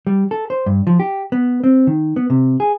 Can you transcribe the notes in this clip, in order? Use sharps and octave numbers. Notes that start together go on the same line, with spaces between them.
G3
A4
C5
G2
F3
G4
B3
C4
D#3
B3
C3
G#4